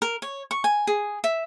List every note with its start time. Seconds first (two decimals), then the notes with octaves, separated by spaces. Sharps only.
0.02 A#4
0.22 C#5
0.51 C#6
0.64 G#5
0.87 G#4
1.24 E5